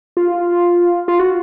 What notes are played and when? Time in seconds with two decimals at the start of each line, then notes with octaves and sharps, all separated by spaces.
0.17 F4
1.08 F4
1.19 F#4